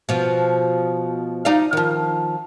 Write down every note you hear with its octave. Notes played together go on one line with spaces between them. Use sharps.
B2 F3
D#4 D5 F5
D#3 F3